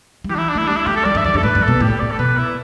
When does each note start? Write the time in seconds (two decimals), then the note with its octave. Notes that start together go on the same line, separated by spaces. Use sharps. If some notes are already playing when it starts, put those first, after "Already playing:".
0.24 G3
0.29 E3 G4
0.35 D4
0.38 E4
0.49 D4
0.55 A3 E4
0.67 G3 D4
0.76 E4
0.86 A3 G4
0.96 A4
1.05 G3 D5
1.15 G2 E5
1.24 E2 D5
1.34 G2
1.37 A4
1.43 A2 B4
1.55 G2
1.62 A4
1.68 B2
1.80 A2 G4
2.00 D5
2.11 A4
2.19 B2 B4
2.38 E4